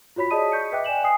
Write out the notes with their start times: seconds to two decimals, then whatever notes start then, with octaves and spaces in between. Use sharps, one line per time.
0.16 F4 F#4 C#5 B5 B6
0.31 G#4 D5 D#5 A5 D#6 D#7
0.52 C#6 G6 B6 C#7
0.72 B4 D#5 E5 G5 D6 F#6
0.84 D5 G#5 E7 F#7
1.03 G5 G#5 D#6 C7